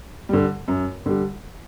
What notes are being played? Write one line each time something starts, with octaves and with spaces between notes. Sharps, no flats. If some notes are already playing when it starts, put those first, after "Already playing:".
D3 G3
F#2
D3 G3